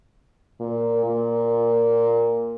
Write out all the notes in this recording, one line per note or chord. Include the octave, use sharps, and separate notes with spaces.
A#2
A#2